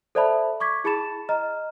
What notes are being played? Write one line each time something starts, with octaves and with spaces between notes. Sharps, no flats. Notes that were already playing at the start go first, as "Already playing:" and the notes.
A4 C5 D5 E5 A5 B5
C#6 D6 G#6 B6
E4 G#4 A5 B5 A6 E7
D#5 A#5 F6